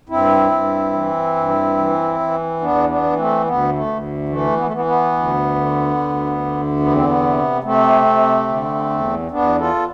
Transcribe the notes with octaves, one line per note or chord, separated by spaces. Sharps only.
G2 C4 E4
G2
E3
G2
E3
E3
E2 B3 D4
B3 D4
E3
A3 C4
D2 B3
A3
D2
E3 A3
B3
A3
E3 B3
B3
D2
D3
D2
D3
E2 B3
C4
B3
C3
C3 A3 C4
C3
D3
E2
E2 B3 D4
F4 A4